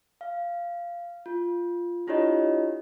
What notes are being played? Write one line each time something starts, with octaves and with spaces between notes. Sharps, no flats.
F5
F4
D4 E4 F4 G4 C#5 D#5